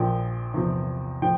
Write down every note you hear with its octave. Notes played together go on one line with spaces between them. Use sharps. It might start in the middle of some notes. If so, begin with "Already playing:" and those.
Already playing: A#1 A#2 F3 G5
E2 C3 F3
A2 F3 G5